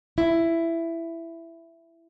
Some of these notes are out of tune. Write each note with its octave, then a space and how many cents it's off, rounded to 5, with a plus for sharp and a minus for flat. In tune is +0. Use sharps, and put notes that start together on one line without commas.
E4 +10